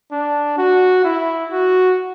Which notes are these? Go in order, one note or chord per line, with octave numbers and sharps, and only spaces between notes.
D4
F#4
E4
F#4